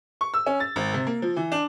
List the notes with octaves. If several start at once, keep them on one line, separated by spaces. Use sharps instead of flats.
C#6
E6
C#4
A6
G#1
C3
A#3
F3
E3
D4